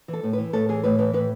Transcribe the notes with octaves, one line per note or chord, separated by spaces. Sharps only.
E3
A4
A2
E3 B4
A2 A4
E3 G#4
A2 B4
E3 B4
A2 B4